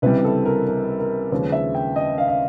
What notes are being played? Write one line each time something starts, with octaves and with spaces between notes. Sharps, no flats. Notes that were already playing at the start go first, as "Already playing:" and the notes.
C#2 C3 E3 G3 B4
A4
A#4
A#4
A#4
D#2 C#3 F3 G#3 B4
E5
G5
D#5
F5
F5